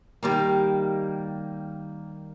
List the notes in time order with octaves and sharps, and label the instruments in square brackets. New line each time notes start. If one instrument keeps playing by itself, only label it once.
[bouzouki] D#3 G3 A#3